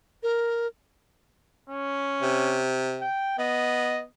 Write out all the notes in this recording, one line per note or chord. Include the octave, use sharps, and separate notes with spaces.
A#4
C#4
C3
G5
B3 D#5